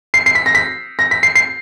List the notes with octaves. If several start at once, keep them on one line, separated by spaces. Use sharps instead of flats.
C7
C7
B6
A#6
B6
A#6
B6
C7
C7